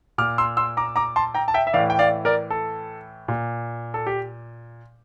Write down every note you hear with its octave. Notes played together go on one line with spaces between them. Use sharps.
A#2 D6 F6
C6 E6
C6 E6
A#5 D6
A#5 D6
A5 C6
G5 A#5
A5
E5 G5
E5
A2 E3 D5 F5
G5
D5 F5
A#4 D5
A4
A#2
A4
G4